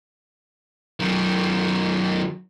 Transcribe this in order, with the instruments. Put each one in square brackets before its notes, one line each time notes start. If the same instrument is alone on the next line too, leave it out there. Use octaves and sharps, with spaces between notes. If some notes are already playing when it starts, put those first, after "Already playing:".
[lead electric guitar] F#2 D#3